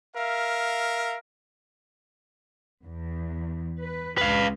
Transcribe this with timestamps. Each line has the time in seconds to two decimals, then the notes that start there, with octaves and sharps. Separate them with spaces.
0.15 A#4 E5 F5
2.84 E2
3.81 B4
4.18 C#2 B4 F5